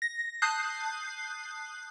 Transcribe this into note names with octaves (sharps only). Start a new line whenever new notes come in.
A#6
A5 D#6 F#6 G6 C7